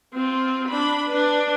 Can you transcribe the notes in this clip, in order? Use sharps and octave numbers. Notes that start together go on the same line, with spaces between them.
C4 F4
D4 B5
D4 B4